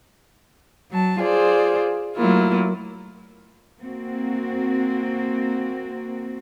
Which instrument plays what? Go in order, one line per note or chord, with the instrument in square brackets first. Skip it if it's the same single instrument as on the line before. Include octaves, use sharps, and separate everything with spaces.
[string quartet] F#3 A5
F4 G#4 C5 D5
F#3 A3 A#3 E4 F4
[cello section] A#3 C4 F#4